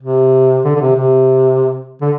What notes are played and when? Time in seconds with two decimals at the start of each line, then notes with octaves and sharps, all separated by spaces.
0.02 C3
0.65 D3
0.76 D3
0.81 C3
0.96 C3
2.02 D3